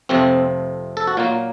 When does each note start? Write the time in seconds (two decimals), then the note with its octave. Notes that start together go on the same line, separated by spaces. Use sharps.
0.09 F2 C3 F3 A3 C4
0.97 A4
1.07 F#4
1.17 A#2 F#3 A#3 F4